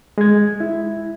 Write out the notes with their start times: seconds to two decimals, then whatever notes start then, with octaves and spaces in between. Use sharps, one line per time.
0.18 G#3 G#6
0.60 E4